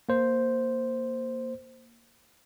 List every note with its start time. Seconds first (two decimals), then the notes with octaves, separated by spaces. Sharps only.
0.09 A#3 C5